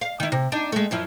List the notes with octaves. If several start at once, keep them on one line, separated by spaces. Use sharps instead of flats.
F5
D#3 E4
C3
D4 D#4
G#3 A3
F#2 F3 E4